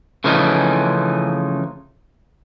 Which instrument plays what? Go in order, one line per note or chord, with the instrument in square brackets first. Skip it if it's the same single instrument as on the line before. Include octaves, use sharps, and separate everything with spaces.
[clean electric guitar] C#3 E3 F3 A3 C#4 D#4